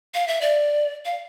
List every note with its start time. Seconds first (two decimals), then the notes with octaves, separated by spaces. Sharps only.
0.14 F5
0.28 E5
0.41 D5
1.05 F5